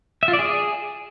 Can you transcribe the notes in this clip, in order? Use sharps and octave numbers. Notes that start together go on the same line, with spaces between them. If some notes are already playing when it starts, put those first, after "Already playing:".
E5
F4
D5
G#4